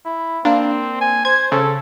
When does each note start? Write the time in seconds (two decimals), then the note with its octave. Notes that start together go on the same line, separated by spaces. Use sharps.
0.05 E4
0.45 A#3 C4 D4
1.01 G#5
1.25 C5 G#6
1.52 C#3 A4